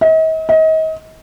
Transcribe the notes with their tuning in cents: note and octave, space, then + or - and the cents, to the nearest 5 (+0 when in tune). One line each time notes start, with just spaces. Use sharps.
D#5 +45
D#5 +35